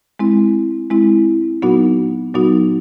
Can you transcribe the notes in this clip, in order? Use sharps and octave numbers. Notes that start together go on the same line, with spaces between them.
G#3 C4 E4
G#3 C4 E4
A#2 F#3 B3 D#4 F#4
A#2 F#3 B3 D#4 F#4